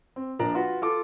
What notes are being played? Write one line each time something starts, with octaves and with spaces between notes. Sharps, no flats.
C4
A#1 F3 D4 A#4 D5 A#5
F4 F#4 B4
F4 A4 D6